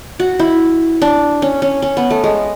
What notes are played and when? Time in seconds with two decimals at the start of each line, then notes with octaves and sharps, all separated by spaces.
0.20 F#4
0.39 E4
1.02 D4
1.42 C#4
1.62 C#4
1.82 C#4
1.97 B3
2.10 A3
2.24 G#3